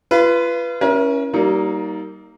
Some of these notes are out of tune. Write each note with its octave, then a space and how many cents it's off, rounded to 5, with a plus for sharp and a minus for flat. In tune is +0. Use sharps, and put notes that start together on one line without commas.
F4 -35 B4 +0
C#4 +0 E4 +0 A#4 +35
G3 -30 A#3 -5 D#4 +20